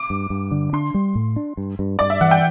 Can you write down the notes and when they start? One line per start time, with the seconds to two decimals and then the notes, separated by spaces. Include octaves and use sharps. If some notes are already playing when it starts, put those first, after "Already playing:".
Already playing: D6
0.10 G2
0.30 G2
0.51 D3
0.73 D4 C6
0.94 G3
1.15 A2
1.36 D4
1.57 G2
1.79 G2
1.99 G2 D5
2.10 E5
2.21 E3 F#5
2.31 G5